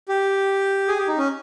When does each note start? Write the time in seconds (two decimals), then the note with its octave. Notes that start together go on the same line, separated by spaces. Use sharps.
0.08 G4
0.88 G#4
0.98 G4
1.08 D#4
1.18 C#4